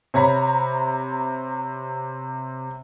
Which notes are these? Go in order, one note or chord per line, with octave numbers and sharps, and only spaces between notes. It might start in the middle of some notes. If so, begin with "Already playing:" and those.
C3 C#5 A#5 B5